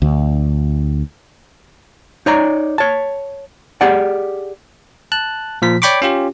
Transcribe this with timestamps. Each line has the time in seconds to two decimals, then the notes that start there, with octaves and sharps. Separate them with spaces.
0.02 D2
2.26 D#4 C#5 D5 A#5
2.78 C#5 A5
3.81 G4 G#4 D5 F#5
5.12 A5 F#6
5.62 A#2 F3 B6
5.82 C#5 D5 G5 B5 C#6 D6
6.02 C#4 F4 G4